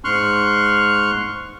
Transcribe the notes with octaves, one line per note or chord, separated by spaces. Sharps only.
G#2 C6 C#6 F6 F#6